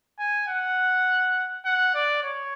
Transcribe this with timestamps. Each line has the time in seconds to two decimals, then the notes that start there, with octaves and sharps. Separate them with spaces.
0.19 G#5
0.48 F#5
1.65 F#5
1.94 D5
2.23 C#5